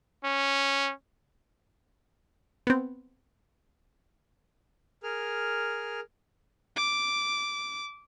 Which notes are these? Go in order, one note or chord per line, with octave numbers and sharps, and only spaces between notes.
C#4
B3 C4
G#4 A#4 F6
D6